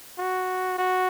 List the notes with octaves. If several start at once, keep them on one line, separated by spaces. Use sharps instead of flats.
F#4
F#4